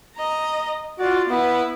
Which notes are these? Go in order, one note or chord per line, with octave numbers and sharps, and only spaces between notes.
D#5 A#5
F4 F#4 D5
B3 E4 B4